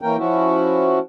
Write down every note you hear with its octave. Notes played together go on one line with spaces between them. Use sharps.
E3 A#3 C#4 A#4 G5
F3 C#4 E4 F#4